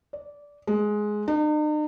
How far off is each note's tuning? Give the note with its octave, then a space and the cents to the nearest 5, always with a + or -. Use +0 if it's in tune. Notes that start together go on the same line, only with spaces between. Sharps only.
D5 -15
G#3 +10
D#4 -45